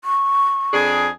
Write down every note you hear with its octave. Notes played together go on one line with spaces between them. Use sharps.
C#6
F2 D4 G#4